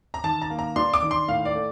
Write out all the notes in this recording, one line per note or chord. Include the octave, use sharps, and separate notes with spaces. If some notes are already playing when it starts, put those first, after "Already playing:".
A#5
D#3 A5
A#5
A#3
A#5
D4 C6
D6
D#3
C6
A2 F5
D5
A3